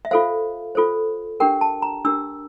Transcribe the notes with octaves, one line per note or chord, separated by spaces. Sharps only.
E5
F4 A4 C5 F5
F4 A4 C5
D4 G4 A#4 G5
A5
A#5
D4 G4 A#4 E6